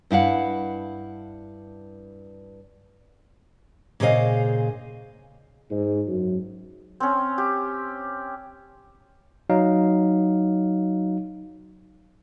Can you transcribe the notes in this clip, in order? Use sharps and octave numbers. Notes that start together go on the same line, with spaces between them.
G2 E4 F5 F#5
A#2 C#3 G#4 C5 D#5 F5
G#2
F#2
C4 C#4
G4
F#3 D#4 F5